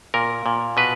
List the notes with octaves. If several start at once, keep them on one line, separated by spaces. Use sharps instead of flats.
A#2 A#4
A#2
B2 B4